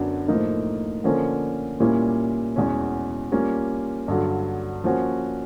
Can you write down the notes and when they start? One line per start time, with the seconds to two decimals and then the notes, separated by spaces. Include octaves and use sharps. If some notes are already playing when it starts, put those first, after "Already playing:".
Already playing: F#2 D3 F#3 B3 D4
0.28 A2 F3 A#3 D#4
1.04 D3 F3 A#3 C#4
1.80 A#2 G3 A#3 C#4 E4
2.56 E2 B2 G#3 C#4
3.32 G3 A#3 C#4 F4
4.08 G2 D3 F#3
4.84 F3 A#3 C#4 F#4